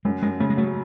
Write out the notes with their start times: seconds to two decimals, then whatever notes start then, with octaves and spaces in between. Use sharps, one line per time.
0.05 F#2 G#3
0.22 F#2 G#3
0.40 C#3 A3
0.50 G#3
0.57 F#3 A3